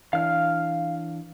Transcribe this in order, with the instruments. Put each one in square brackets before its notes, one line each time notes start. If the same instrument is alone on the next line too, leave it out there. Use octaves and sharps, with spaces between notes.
[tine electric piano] E3 D4 [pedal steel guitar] F5 F6